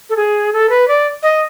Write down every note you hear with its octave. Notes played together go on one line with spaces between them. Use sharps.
A4
G#4
A4
B4
D5
D#5